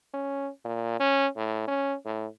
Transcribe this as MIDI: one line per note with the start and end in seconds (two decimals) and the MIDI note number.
0.14 0.49 61
0.65 0.96 46
1.00 1.27 61
1.36 1.67 45
1.68 1.95 61
2.05 2.27 45